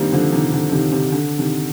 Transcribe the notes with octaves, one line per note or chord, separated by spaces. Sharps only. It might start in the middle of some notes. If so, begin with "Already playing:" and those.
Already playing: D#3 G3 A#3 C4 D4 D#4
D3 F3
C3 D#3
D3
C3 D#3
C3
D3
C3 D#3